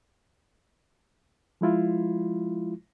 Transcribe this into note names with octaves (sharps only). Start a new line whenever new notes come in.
F3 G#3 E4 F4